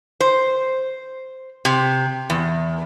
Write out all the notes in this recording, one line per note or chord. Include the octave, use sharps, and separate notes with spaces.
C5
C3
E2